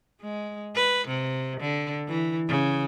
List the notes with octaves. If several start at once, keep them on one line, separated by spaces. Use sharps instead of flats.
G#3
B4
C3
D3
E3
C#3